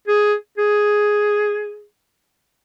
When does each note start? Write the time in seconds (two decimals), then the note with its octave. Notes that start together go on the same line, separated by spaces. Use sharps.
0.08 G#4
0.58 G#4